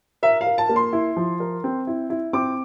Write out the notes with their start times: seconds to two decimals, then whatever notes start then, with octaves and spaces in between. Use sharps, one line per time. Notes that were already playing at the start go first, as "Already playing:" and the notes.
0.23 A#4 E5
0.41 F5
0.47 A#4
0.58 A5
0.69 A#3
0.76 C6
0.93 E4
1.17 F3
1.40 A#4
1.64 C4
1.87 E4
2.10 E4
2.33 C4 D6